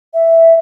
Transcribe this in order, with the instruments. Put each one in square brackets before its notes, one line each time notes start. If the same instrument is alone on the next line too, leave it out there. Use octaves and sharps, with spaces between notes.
[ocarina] E5